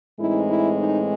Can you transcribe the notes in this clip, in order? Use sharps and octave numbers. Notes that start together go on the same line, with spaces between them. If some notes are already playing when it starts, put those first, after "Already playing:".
A2 E3 G#3 C4 D#4 E4
E4
D#4